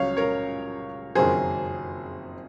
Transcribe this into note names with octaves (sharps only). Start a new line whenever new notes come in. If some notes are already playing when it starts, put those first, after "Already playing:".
Already playing: C#2 C#3 F#3 C#5 F5
A#4 C#5
F#1 F2 D#3 F#3 G#4 C5